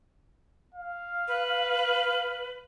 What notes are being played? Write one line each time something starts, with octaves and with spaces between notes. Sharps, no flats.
F5
B4